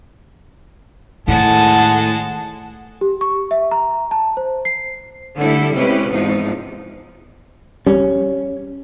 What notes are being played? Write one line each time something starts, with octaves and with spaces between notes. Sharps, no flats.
A2 D#3 G#3 A4 F#5 A5
G4
C#6
E5
A#5
A5
C5
C7
D3 G3 A3 E4 A4
C3 G#3 C#4 E4 G4 B4
E2 G#2 C3 F3 G#3 D#4
C#2 G3 C#4